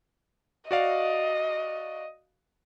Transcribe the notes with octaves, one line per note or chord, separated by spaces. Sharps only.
F#4 D5 D#5 F5